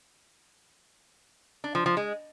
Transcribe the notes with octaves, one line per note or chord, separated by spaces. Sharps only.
D4
F3
F3
G#3